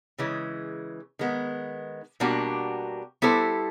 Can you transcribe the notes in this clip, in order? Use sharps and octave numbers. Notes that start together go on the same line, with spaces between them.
C#3 E3 G#3
D#3 G#3 B3
B2 G3 A#3 D4 F#4
G3 B3 E4 A4 C5